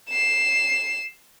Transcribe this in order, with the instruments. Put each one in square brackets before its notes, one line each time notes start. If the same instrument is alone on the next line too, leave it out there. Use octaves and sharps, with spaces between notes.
[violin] C7 E7